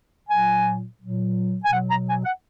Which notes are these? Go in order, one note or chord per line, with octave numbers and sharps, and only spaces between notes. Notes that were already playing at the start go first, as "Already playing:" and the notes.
A#2 F#3 G#5
A#2 F#3
G#5
B2 F#3 F#5
A#5
G#5
F#5